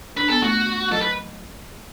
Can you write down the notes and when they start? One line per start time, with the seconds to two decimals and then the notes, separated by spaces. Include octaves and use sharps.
0.16 D4 B4
0.29 B3 A4
0.42 A3 F#4
0.92 F#3 A4
1.01 B4